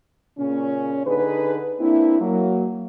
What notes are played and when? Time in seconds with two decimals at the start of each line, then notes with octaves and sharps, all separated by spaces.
0.38 A#2 C#3 C#4
1.06 D3 D#4 G#4 B4
1.80 A#3 C4 D4 E4
2.20 F#3 A#3